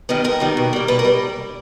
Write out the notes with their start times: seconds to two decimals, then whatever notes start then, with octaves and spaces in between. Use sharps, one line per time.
0.09 D#3 G3 B3 D#4
0.24 G#2 A#4
0.40 D#3 G3 B3 D#4
0.57 B2
0.73 G3 A#3
0.88 B2 B4
0.99 A#4
1.05 G3